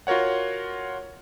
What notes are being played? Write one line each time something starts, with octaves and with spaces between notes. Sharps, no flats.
F4 F#4 A#4 C#5 F#5